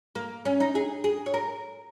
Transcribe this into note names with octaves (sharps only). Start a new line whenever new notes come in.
A#3
C#4
D#4
G#4
G#4
C#5
A#4